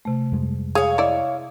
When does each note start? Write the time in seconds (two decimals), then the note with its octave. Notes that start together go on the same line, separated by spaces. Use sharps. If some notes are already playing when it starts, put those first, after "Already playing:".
0.05 C3 A3
0.32 F2 G3 G#3
0.75 G#4 C#5 F5
0.98 E4 D5 D#5